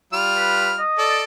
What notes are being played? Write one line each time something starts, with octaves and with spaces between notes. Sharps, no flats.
G3 F4 F6
B4
D#5
A4 D5